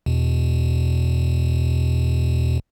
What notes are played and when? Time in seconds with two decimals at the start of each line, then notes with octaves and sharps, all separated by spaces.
0.06 E2 B2